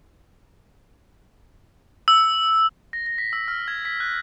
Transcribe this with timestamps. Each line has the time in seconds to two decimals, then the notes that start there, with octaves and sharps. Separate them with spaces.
2.08 E6
2.93 A#6
3.06 A#6
3.18 B6
3.33 E6
3.48 F6
3.68 G#6
3.85 B6
4.00 F#6